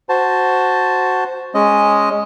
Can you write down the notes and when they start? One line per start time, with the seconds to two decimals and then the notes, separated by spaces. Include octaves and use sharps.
0.09 F#4 C5 A5
1.54 G#3 C#4 D#5